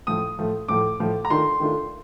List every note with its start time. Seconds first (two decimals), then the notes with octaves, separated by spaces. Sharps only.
0.07 A2 F3 A3 D#6
0.39 A2 F3 A3
0.68 A2 F3 A3 D6
1.00 A2 F3 A3
1.25 A#5
1.30 D#3 A3 D4 F4 C6
1.60 D#3 A3 D4 F4